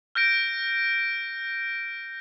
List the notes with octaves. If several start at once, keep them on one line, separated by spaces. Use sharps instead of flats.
F6 G6 A#6 D7